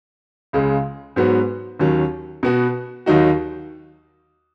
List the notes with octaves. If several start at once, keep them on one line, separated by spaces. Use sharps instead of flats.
C#2 C#3 G#3
G#2 F#3 B3 F#4
D#2 D#3 F#3 C#4
B2 B3 F#4
D#2 D#3 F#3 D#4 F#4